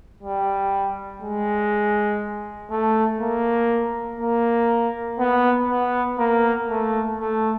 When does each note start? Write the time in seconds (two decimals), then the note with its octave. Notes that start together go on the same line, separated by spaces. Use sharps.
0.23 G3
1.22 G#3
2.71 A3
3.21 A#3
4.20 A#3
5.19 B3
5.69 B3
6.18 A#3
6.68 A3
7.18 A3